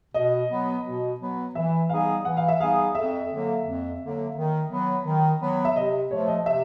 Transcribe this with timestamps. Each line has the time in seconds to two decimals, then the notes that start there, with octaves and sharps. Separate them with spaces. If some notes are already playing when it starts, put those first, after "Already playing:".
0.14 B2 D#5
0.50 F#3 B3
0.85 B2
1.20 F#3 B3
1.55 E3 E5
1.89 G3 B3 D#4 G#4 F5
2.25 E3 F#5
2.37 F5
2.48 E5
2.60 G3 B3 D#4 G#4 F5
2.94 F2 E5
3.30 D3 F#3 A#3
3.65 F2
4.00 D3 F#3 A#3
4.36 D#3
4.71 F#3 B3
5.05 D#3
5.41 F#3 B3
5.65 E5
5.76 C3 D#5
6.10 F3 A3 C#5
6.28 D#5
6.46 C3 E5